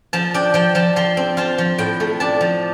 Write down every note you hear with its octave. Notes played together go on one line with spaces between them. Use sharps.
F3 A5
D4 G5
F3 G5
F3 A5
F3 C6
C4
F4 A5
F3
A2 G5
A3
D4 A5
F3